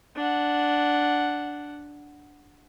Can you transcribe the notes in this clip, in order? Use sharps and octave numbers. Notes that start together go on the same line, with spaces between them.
D4 F#5